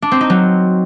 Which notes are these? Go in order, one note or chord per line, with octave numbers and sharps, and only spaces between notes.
D4
C4
D#4
F#3